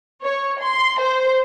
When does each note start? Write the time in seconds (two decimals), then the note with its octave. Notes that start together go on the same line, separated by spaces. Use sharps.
0.21 C#5
0.59 C6
0.98 C5